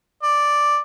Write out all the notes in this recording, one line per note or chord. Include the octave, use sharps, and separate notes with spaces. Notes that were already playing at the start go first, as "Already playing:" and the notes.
D5